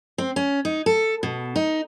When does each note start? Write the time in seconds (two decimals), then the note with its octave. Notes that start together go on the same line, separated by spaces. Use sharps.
0.18 C4
0.36 C#4
0.65 D#4
0.86 A4
1.23 B2
1.56 D#4